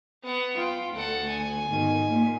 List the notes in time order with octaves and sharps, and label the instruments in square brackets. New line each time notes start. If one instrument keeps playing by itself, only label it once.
[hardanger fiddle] B3 F#5
[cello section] F4 [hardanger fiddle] G5
[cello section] D2 [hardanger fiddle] A4 F#5
[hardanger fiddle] G#5
[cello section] G#2 B2 D#3
A#2